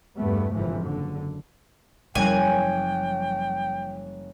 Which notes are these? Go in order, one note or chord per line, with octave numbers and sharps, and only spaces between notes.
E2 G2 A3 B3
G1 F2 G#2 C3 E3 F3
F#1 D3
F#1 F3 G3 C#4 G5 G#5 F#6